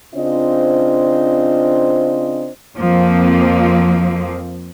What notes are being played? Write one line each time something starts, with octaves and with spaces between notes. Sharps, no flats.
C#3 C4 D4 F4 C5 D#5
F2 F3 A#3 C4